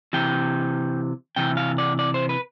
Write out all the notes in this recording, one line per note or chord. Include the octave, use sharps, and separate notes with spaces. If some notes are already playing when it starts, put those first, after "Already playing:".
C3 E3 G5
C3 E3 G5
F5
D5
D5
C5
B4